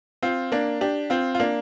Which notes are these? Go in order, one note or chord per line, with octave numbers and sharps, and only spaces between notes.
C4 F4
A#3 D4
D4 G4
C4 F4
F4
A#3 D4